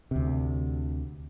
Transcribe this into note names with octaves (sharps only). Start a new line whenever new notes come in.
D2 C3